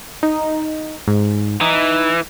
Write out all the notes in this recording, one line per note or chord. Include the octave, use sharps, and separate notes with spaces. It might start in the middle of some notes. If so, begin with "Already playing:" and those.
D#4
G#2
E3 D#4